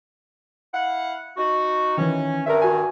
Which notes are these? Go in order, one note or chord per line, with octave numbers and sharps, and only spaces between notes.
E4 F5 F#5
D#4 F#4
D#3 E3 C#4
G2 D#3 A#4 E5
F#4 G#5